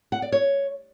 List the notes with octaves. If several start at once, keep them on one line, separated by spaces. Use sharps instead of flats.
F#5
D5
C#5